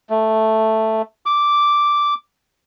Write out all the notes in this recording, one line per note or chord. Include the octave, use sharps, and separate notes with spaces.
A3
D6